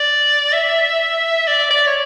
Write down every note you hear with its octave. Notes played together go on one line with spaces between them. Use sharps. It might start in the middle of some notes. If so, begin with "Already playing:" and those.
Already playing: D5
E5
D5
D5
C#5